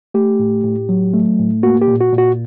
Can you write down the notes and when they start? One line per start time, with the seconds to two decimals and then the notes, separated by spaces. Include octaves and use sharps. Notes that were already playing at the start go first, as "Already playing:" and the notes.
0.14 A3 G4
0.39 A2
0.64 A2
0.89 F#3
1.13 A3
1.39 A2
1.63 A#3 F#4
1.82 G4
1.88 A#2
2.00 F#4
2.13 A#2
2.18 F#4